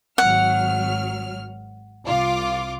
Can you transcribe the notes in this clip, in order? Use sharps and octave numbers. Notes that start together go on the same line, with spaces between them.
G#1 F#3 F#5 F6
C2 F4 D6